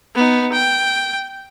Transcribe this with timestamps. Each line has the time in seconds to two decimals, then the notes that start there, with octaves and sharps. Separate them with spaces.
0.15 B3 D#4
0.52 G5